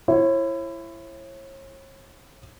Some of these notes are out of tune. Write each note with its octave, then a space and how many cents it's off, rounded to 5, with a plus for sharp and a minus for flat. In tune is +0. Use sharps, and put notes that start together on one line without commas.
E4 +25 C#5 -40